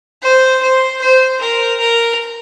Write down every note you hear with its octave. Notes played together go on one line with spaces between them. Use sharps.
C5
C5
C5
A#4
A#4